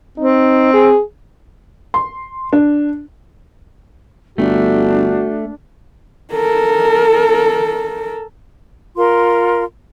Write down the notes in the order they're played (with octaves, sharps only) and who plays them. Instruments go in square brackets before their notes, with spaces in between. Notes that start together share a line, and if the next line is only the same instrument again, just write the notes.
[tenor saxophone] C4 [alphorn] D#4
[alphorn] G#4
[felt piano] C6
D4
[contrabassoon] G1 [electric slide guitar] A3 [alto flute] D4 [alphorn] F#4
[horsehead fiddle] A4 A#4
[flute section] F4 A#4 C6